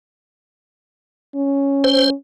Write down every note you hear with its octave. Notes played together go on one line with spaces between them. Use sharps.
C#4
C5